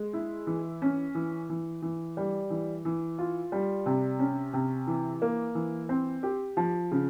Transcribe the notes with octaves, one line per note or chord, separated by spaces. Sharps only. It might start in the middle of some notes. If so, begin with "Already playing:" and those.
Already playing: G#3
E4
E3
C#4
E3
E3
E3
G3
E3
E3
F4
G3
C3
C#4
C3
E3
A#3
E3
C4
G4
F3
C#3